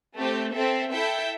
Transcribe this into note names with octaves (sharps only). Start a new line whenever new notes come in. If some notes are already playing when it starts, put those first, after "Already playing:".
A3 C4 G4
C4 A4 E5
E4 A4 E5 G5